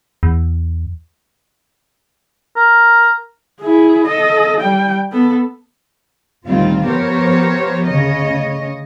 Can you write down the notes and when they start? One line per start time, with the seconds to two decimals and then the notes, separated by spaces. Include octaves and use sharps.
0.23 E2
2.57 A#4
3.61 E4 G#4
4.06 A4 D#5
4.61 G3 G5
5.12 B3 A4
6.44 D2 A#2 D#3 G3 C4 F4
6.85 F3 B3 G4 A#4 C5 C#5
7.86 D2 C#3 C#5 D#5